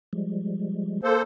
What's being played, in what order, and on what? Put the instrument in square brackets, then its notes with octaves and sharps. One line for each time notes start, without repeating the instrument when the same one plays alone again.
[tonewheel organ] F3 G3 G#3
[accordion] A#3 A4 C5